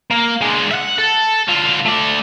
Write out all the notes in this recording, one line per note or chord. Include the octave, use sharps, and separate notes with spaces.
A#3
G#3 D4
E5 F#5
A4
D3 F4
A3 D5